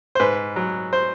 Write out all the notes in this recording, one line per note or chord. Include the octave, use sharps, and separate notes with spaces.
C5
G#2 B4
F#3
C5